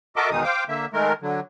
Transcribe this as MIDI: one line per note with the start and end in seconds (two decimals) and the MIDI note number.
0.16 0.30 66
0.16 0.30 69
0.16 0.30 70
0.16 0.30 75
0.16 0.30 76
0.16 0.30 86
0.31 0.43 40
0.31 0.43 47
0.31 0.43 51
0.31 0.43 56
0.31 0.43 63
0.31 0.43 87
0.43 0.64 72
0.43 0.64 77
0.43 0.64 79
0.43 0.64 86
0.68 0.86 50
0.68 0.86 58
0.68 0.86 76
0.93 1.13 51
0.93 1.13 56
0.93 1.13 57
0.93 1.13 70
1.22 1.40 50
1.22 1.40 54